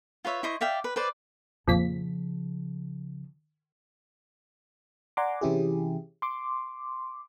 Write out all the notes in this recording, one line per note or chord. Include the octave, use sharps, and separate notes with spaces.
F4 B4 C#5 E5
E4 C5 D#5 C#6
D5 E5 F5 G5
B4
B4 C5 D5
F2 A#2 C#3 F3 B6
D5 F#5 G#5 A#5 C6 D6
C3 E3 C#4 E4 G4 G#4
C6 D6